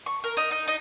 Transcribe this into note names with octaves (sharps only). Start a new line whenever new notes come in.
C#6
A#4
D#4
D#4
D#4